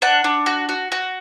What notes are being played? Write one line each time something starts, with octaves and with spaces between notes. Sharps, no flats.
D4 F#5
D4
F#4
F#4
F#4